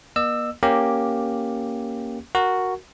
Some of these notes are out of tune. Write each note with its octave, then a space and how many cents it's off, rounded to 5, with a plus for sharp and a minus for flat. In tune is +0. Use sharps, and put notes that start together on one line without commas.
A#3 +40 D#5 -40 E6 +5
A#3 +5 C#4 +0 G4 +0
F#4 +0 A#4 +0